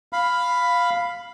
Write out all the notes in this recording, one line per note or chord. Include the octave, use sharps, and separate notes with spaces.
F5 B5